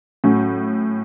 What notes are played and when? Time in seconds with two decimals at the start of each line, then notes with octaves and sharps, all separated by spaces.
0.24 A2 F#3 C#4